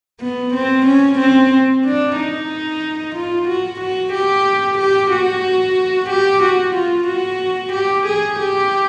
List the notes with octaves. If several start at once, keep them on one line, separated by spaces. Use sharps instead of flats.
B3
C4
C#4
C4
D4
D#4
F4
F#4
F#4
G4
G4
F#4
G4
F#4
F4
F#4
G4
G#4
G4